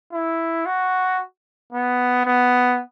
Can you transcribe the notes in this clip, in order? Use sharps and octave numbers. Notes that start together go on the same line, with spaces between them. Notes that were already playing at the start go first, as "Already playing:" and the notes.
E4
F#4
B3
B3